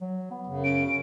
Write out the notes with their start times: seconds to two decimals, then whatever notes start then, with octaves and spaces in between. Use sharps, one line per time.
0.01 F#3
0.31 B3
0.46 F#2 C#3
0.64 C#4 D7